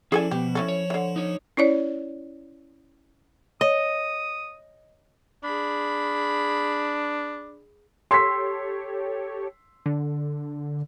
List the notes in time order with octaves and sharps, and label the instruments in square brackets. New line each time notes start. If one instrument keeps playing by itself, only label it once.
[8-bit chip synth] F3 [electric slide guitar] C#4 E4 D5 [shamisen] G#4 A4 G#5
[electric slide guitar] B2 A#3 B3 [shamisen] G4
[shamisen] E3 C#4 A4
[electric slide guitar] C#5
[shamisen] D3 E3
[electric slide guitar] D#4 C#5
[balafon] C#4 E4 C#5 D5
[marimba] C#5 [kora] D#5 [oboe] D#6
[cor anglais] D4 [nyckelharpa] G#4 B5
[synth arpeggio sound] G4 A4 C#5 [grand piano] C6 E6 B6
[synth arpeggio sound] D3